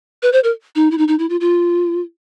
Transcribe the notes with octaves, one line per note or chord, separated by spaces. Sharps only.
B4
C5
A#4
D#4
E4
D#4
D#4
E4
F4
F4